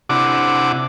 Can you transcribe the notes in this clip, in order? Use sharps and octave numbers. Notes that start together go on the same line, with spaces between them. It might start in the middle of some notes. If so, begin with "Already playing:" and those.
C3 D4 E4 F#5 D6